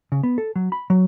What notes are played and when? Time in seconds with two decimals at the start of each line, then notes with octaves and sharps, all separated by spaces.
0.12 C#3
0.23 B3
0.38 A4
0.56 F#3
0.72 B5
0.90 F#3